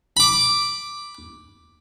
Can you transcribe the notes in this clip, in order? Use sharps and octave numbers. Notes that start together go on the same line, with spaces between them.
B5 D6